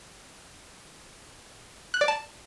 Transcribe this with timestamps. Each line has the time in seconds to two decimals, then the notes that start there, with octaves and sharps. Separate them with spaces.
1.94 F#6
2.01 D5
2.08 A5